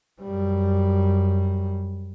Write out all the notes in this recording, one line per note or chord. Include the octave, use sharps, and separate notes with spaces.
F#2 G3